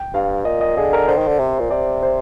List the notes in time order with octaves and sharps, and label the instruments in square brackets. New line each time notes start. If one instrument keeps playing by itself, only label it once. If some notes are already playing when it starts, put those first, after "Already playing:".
Already playing: [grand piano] G5
[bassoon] G2 [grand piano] F5
[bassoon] A#2 [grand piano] D#5
[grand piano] D#5
[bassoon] D3 [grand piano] G#4
[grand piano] A#4
[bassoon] D3 [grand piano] C5
[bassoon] D#3
D3
C3
A#2
[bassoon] C3 [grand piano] D5
[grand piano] C5